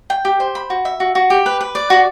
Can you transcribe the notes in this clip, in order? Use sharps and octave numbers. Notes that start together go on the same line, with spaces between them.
G5
G4
C5
B5
F#4
E5
F#4
F#4
G4
B4
B4
D5
F#4